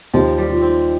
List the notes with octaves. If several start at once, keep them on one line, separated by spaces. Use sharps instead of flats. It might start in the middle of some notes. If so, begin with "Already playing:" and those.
D#2 F3
G3
F3
C4